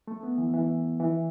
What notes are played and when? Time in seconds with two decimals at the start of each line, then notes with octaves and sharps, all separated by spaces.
0.07 A3
0.23 B3
0.38 E3
0.54 E3
1.00 E3